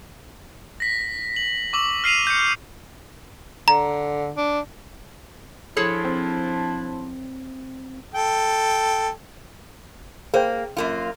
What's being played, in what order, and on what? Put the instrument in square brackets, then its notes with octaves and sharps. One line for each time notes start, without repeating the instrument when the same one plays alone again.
[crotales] A#6 B6
F#7
C#6 D6 E6 F#7
F6 C7 D#7 F7
G6 C#7
[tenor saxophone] D3 [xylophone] A#5
[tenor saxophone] D4
[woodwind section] F3 D4 E4 [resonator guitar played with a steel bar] G#4 A4 C#5
[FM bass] C4
[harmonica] A4 G5
[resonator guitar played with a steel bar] A#3 [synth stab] G#4 C5 G5
[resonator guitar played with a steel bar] F#2 A#3 F4